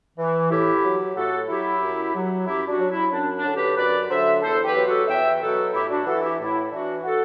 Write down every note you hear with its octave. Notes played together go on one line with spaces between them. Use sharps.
E3
A2 E4 G4
F#3
A2 F#4 A4
F#3 E4 G4
F#2
F#3
F#2 E4 G4
D4 F#4
F#3
E4
F#2 D4
D4
D3 F#3
G4 B4
F#2 B4 D5
D3 F#3 C5 E5
E2 A4 C5
G4 B4
B2 F#3
F#4 A4
E2 E5 G5
B2 F#3 F#4 A4
A2 E4 G4
D4 F#4
E3 F#4 A4
E4 G4
A2 E4
E3 D4 F#4
F#4 A4